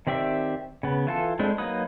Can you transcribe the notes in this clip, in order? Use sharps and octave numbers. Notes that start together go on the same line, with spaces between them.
D#3 C4 G4 D5 E5
C#3 B3
E3 F4 A4
G#3 A3 C4 D4 E4
F#3 A#3 D#4 B4 D#6